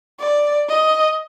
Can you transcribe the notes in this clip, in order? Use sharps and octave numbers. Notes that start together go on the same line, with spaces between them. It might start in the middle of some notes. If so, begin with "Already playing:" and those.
D5
D#5